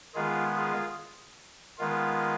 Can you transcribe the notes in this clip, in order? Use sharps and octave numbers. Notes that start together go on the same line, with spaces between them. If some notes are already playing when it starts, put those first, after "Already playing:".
D#3 G#3 B3 F4 G#4
F4 G#4
D#3 G#3 B3 F4